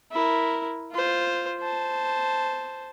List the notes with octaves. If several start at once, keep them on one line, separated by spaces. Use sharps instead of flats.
E4 A#4
F4 C5
C5 A5